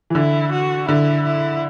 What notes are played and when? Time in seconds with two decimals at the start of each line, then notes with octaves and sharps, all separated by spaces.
0.10 E3
0.15 D3 E4
0.52 F#4
0.88 D3 E4
1.25 E4